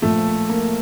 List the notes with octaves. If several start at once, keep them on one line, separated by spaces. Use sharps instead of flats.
A#1 A#2 F3 A3
A#3